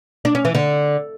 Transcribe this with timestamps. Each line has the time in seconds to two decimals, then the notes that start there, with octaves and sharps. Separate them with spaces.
0.25 D4
0.35 C#4
0.45 E3
0.55 D3